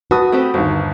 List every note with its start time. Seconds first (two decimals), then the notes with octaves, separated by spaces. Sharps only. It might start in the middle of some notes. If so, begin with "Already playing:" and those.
0.11 F#4 B4 A5 D#6
0.32 A3 C4 G4
0.54 G1 D#2 C4